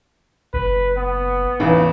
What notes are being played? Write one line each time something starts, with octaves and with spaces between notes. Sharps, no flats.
F#1 B4
B3
A1 E2 D#4 B4 F5